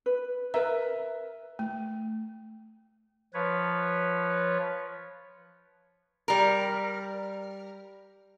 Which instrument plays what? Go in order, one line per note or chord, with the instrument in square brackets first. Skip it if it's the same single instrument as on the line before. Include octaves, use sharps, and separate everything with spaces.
[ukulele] B4
[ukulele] A#4 B4 E5 [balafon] A#5
[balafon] A3
[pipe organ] F3 B4 C#5
[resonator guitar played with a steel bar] G3 A#4